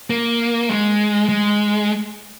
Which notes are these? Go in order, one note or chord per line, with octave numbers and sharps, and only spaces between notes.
A#3
G#3
G#3